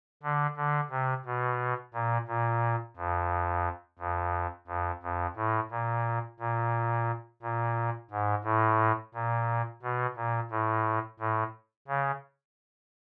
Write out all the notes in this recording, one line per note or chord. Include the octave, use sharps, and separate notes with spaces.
D3
D3
C3
B2
A#2
A#2
F2
F2
F2
F2
A2
A#2
A#2
A#2
G#2
A2
A#2
B2
A#2
A2
A2
C#3